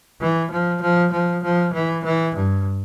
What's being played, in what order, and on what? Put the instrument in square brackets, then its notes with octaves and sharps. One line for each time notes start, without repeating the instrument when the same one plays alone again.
[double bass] E3
F3
F3
F3
F3
E3
E3
G2